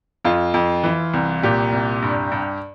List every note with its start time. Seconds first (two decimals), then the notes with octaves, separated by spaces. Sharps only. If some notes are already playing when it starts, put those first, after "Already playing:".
0.25 F2 F4
0.54 F2
0.84 E3
1.13 C2
1.43 A#2 G4
1.72 C2
2.03 G2
2.32 G2